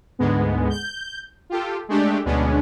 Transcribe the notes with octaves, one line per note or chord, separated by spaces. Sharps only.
D2 G#2 G#3 B3
G6
F4 G4 A4
G#3 A3 D4 G4
D2 B2 G#3 B3 C#4 D4